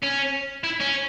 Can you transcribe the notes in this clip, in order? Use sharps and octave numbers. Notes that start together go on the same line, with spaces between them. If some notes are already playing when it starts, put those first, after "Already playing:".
C#4
E4
C#4